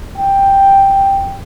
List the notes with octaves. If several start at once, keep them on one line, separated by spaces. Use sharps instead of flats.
G5